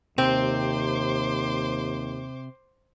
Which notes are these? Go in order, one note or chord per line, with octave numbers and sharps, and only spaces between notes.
D#2 C3 C4 C5 C6 D6